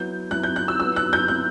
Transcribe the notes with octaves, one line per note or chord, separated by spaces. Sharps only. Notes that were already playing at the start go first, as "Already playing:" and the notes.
Already playing: F#3 B3 E4 G6
F#3 B3 E4 F#6
G6
F#6
E6
F#3 B3 E4 E6
F#6
G6
F#3 B3 E4 F#6